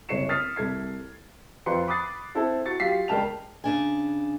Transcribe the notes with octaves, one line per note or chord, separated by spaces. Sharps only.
F#1 C2 C#5 C7 C#7 E7
D#6 F6 A6 B6 C7
C2 A4 G#6 C7
F2 F3 B4 C6 C#7
B5 D6 D#6 F#6 A6 C7
C4 E4 A4
F#4 A6 C#7
F#3 F4 G4 B6 C7
G1 C#2 A#4 G5 A5 F7
C#3 D4 G#5